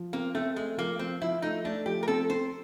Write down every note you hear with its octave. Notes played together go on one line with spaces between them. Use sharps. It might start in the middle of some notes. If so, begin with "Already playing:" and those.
Already playing: F3
A#3 C4
A3 C4
G#3 A3
F3 A#3
F3 C4
F3 E4
A3 D#4
A3 D4
F3 G4
A#4
C4 A4
C4 C5